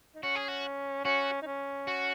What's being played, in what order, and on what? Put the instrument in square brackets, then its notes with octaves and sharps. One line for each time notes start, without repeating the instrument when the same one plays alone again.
[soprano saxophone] D#4
[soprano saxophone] C#4 [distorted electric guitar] F#4
[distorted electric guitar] G#4
F#4
[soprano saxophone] C#4 [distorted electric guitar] F#4
[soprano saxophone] D#4
C#4
[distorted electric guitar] F#4